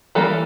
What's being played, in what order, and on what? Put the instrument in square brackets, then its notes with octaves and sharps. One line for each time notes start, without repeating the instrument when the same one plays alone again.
[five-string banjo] E3 G3 A#3 A4